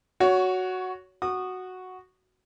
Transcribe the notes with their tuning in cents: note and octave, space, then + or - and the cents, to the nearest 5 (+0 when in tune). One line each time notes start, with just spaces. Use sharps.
F#4 +0 C#5 +20
F#4 +0 D#6 -25